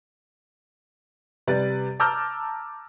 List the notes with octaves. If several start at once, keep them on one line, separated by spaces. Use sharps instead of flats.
C3 G3 B4 D5 A6
A5 A#5 D6 E6 F6 G6